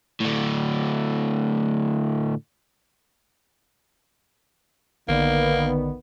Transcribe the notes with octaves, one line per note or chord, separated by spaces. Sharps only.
A2 D3
A#1 D3 D#3 A#3 B3 D5